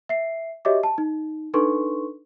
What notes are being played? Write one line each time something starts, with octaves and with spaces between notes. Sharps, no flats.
E5 C7
F#4 G4 C#5 D#5 E5 D6
A5
D#4
D4 D#4 A4 B4 C6 C#6